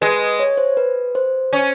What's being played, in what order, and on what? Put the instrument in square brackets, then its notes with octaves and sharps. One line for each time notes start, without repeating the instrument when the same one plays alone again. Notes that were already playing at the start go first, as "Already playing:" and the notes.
[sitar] G#3 [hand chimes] B4
[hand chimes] C#5
C5
B4
C5
[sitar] C#4